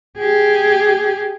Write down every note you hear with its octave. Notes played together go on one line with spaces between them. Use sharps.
G4 G#4